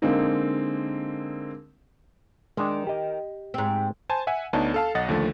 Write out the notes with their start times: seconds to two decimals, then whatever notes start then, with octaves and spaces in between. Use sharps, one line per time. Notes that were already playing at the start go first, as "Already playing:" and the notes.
0.02 D3 G#3 A#3 C4 D#4
2.57 D#3 G#3 D4
2.87 G4 D#5
3.54 G#2 C4
4.09 C5 G#5 A5
4.27 E5 F#5 G#5
4.53 D2 B3 D4 D#4 C#5 A5
4.74 A4 F5 A5
4.95 B1 D#5 F#5 A6
5.08 D#2 D3 F3 A3